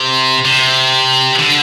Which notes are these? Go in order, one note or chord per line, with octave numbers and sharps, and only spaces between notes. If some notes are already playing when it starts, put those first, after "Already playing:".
Already playing: C3
C3
D3